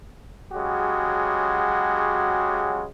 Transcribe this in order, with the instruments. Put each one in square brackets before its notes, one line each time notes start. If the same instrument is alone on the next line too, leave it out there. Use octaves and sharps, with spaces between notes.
[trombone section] C#3 F#3 G#3 F#4 G4